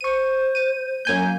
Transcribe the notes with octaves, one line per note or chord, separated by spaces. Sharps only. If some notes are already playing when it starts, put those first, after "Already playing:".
C5 C#6 D#7
D#7
F#2 A#3 G#5 G6